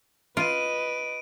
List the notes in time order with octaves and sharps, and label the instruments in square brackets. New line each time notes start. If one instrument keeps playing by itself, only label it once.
[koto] F4 [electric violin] B4 D#5 [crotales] D7 D#7